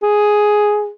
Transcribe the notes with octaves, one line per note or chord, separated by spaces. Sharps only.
G#4